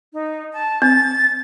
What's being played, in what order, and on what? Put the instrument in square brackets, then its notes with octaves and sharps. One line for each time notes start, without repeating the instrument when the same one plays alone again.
[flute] D#4
A5
[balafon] C4 [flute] A6